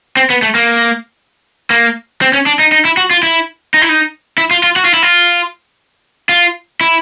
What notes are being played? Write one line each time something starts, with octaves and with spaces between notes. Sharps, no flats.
C4
B3
A3
A#3
A#3
C4
C#4
D4
D#4
D#4
E4
F#4
F4
E4
D#4
E4
D#4
E4
F4
F4
F#4
F4
E4
F4
F4
E4